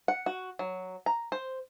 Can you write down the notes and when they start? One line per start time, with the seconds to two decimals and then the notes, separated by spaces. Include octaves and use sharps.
0.08 F#5
0.26 F#4
0.59 F#3
1.06 A#5
1.32 C5